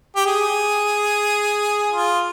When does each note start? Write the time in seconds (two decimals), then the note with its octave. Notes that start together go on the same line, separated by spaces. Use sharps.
0.16 G4
0.26 G#4
1.92 F4